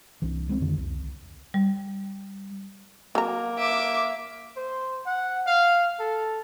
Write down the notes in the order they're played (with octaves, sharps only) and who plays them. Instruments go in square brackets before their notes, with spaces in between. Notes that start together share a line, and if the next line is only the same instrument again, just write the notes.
[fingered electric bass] C2 E3
F#3 G#3 A#3 C4
F2 D3 D#3
C2
[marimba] G3
[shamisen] F#3 A#5 [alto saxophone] A#3
[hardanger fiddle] E5 [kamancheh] D6
[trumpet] C5
F#5
F5
A4